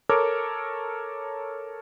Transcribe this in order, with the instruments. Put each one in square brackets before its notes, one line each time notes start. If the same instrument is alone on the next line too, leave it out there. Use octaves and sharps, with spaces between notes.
[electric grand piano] A4 A#4 C#5 D6